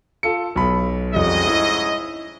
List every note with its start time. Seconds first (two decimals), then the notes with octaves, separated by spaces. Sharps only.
0.23 F4 A4 C#7
0.56 B1 B5
1.14 F2 G#2 C#3 G3 D#5
1.47 E4